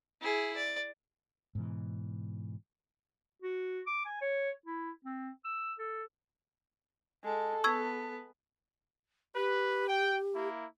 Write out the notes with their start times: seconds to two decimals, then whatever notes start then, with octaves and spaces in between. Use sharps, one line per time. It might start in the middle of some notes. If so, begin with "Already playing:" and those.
0.22 E4 G#4
0.57 D5
1.55 G#2 B2 E3
3.42 F#4
3.87 D6
4.06 G#5
4.21 C#5
4.66 E4
5.04 C4
5.44 E6
5.78 A4
7.24 G#3 A4
7.64 B3 C#6 E6 G#6
9.35 G4 B4
9.88 G5
10.34 A#3 E4